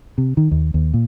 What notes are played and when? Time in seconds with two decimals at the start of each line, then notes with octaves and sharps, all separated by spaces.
0.18 C3
0.37 D#3
0.51 D#2
0.74 D#2
0.94 A#2